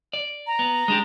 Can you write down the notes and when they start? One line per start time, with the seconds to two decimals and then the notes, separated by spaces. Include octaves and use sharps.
0.13 D5
0.47 A#5
0.59 B3
0.88 G#3 D4 G4